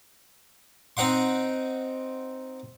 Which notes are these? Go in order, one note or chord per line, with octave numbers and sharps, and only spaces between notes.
C4 D#4 F#5 C6